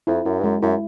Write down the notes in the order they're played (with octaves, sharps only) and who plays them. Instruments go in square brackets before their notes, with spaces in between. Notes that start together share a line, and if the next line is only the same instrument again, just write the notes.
[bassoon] F2 [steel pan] E4
[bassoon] F#2 [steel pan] E4
[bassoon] G2
[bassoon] F#2 [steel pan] G#3
[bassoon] F#2 [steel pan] E4